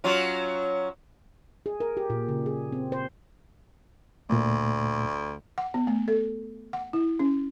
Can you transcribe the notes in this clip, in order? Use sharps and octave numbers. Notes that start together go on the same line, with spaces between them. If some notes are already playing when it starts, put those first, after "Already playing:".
F#3 C#4 F4
G#4
A#4
G4
A#2
C#3
G#4
C4
C5
D2 A#2 A3
F#5
B3
A3
A4
F#5
E4
C#4